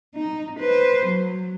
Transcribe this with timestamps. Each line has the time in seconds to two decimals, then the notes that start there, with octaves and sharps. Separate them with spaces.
0.16 D#4
0.59 B4 C5
1.06 F#3